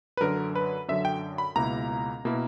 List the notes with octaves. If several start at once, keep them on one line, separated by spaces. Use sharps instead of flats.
B4
F#2 D3 F#3 A#4
B4
F#2 D3 F#3 E5
G5
B5
C#2 B2 A#3 E4 A#5
B2 A#3 E4